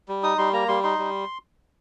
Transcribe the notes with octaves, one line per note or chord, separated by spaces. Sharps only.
G3
D#4 D#6
G3 C6
A#3 A#5
G3 C6
D#4 C6
G3